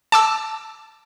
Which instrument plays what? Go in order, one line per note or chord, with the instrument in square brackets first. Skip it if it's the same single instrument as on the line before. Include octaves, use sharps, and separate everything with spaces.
[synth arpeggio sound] A5 D6 E6